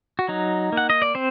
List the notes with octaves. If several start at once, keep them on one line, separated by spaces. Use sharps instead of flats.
F#4
F#3 D#4
A#3 F#5
D#5
D5
C4 C5